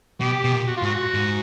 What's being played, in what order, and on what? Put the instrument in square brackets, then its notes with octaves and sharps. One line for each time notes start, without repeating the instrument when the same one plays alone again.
[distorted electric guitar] B2 [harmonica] G4
[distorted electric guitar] B2
A#2
[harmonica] F#4
F4
[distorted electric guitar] G#2 [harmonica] F#4
[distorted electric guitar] G#2